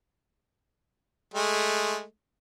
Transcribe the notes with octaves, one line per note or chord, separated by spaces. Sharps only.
G#3 A3